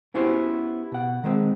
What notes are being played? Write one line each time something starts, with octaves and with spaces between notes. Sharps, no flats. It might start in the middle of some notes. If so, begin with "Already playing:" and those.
B3 C#4 E4 F#4 G4 C5
B2 F#5
D#3 G#3 C4